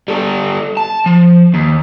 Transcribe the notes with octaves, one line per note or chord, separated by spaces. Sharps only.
G3 A4
A5
F3
D#2